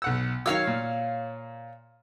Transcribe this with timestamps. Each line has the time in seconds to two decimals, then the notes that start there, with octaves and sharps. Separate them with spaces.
0.02 B1 F#5 E6
0.46 D#3 F#3 C#5 F5 E6
0.67 A#2